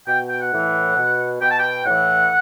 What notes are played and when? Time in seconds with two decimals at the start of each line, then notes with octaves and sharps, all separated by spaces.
0.07 B2 G5
0.30 G5
0.41 F#5
0.52 A2 E3
0.97 B2
1.41 B2 G5
1.51 A5
1.59 G5
1.86 A2 E3 F#5